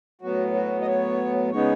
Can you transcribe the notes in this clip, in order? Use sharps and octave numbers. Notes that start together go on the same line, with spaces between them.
A2 F#3 B3 F#4
F#4
D#5
C#5
C#3 G#3 B3 D#4 C#5